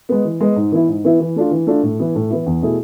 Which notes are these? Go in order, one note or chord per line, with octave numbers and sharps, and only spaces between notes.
G#3 B3
E3
G#3 B3
G#2
E3 B3 E4
G#2
E3 B3 E4
E3
A3 D4 F4
E3
A3 D4 F4
A2
E3 B3 E4
A2
E3 B3 E4
E2
B2 A3 E4 G#4